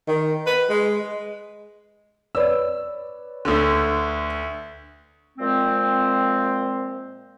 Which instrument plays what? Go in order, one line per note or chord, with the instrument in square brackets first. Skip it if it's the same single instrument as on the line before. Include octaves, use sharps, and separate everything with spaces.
[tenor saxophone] D#3
B4
G#3
[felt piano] B4 C#5 D5 [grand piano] E6
[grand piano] D2 D3
[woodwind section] A#2 F3 G#3 C4